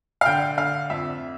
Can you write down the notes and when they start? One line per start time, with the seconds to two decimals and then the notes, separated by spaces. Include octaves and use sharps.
0.21 F5
0.25 D3 G5
0.57 D3 F5
0.90 F2 E5